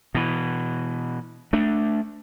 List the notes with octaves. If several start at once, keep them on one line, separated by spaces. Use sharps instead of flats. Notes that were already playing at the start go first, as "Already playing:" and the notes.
B2 E3
A3 D4